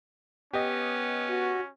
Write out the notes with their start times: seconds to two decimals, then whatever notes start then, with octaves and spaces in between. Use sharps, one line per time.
0.53 B3 C#4 G4 D#5
1.29 F#4